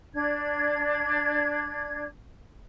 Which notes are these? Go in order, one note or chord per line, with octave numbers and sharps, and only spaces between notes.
D4 G#6